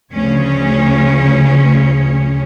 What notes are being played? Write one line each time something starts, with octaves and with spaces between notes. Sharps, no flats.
D2 C#3 F3 C#4 C#5